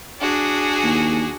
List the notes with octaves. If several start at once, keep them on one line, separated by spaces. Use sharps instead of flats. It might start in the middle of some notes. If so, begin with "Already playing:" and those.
D4 F#4 G#4
D#2